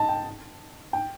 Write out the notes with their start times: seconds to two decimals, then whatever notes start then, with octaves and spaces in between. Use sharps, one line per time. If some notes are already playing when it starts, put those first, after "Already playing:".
Already playing: D#5 A5
0.09 G5
0.93 G5